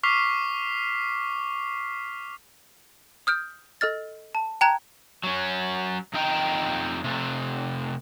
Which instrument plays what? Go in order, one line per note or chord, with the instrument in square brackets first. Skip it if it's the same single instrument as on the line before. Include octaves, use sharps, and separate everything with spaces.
[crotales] C#6 D6 F6 B6 C7 F7
[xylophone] D#6 F6 G6 D7
A4 D#5 F6 A6
A5
G5 A5 A#5 F#6 G#6 E7
[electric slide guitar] F#3 C#4
F2 D#4 D#5 G5 A#5
C3 A3